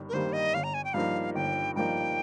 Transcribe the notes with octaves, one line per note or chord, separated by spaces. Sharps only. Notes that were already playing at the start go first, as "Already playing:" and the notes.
Already playing: G1 G2 D#3 G3
A#4
G2 D#3 G3 A#3 C5
D#5
G1 F5
A#5
G#5
G5
G2 F3 A#3 D#4 F5
G1 G5
G2 F3 A#3 D#4 G5